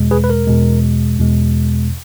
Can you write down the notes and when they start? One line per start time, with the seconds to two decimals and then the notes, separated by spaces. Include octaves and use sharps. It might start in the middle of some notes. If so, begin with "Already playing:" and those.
Already playing: E2 B2 G#3
0.11 G#4 B4
0.24 B4
0.30 A#4
0.47 E2 B2 G#3
1.19 E2 B2 G#3